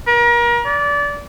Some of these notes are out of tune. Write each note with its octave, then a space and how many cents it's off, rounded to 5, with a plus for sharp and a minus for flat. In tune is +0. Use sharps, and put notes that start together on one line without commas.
A#4 +35
D5 -25